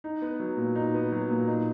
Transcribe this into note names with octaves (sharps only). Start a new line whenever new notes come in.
D#4
B3
F#3
A#2
D#4
B3
F#3
A#2
D#4